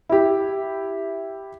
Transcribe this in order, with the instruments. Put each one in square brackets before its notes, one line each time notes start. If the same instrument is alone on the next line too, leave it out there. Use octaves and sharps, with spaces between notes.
[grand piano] E4 G4